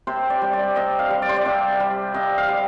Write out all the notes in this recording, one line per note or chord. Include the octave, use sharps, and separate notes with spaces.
C3 C5
D5
G3
D5
C3 D#5
F5
G3
D5
C5
D5
C3
G3
C3 D#5
F5
G3